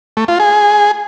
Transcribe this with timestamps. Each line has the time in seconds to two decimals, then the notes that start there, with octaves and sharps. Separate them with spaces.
0.17 A3
0.28 F4
0.40 G#4